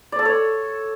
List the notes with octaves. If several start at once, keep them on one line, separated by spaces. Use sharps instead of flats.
D5
A4
C#5